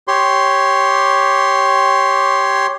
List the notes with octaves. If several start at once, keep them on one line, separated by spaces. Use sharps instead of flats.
G4 C#5 C6